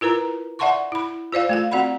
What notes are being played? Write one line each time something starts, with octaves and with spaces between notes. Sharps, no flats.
E4 F4 A#4 B4 A#5
D5 E5 F#5 A5 C6 C#6
E4 B5
F4 C5 D5 F5
A3 F4 F5
C4 F#4 D5 F#5 B5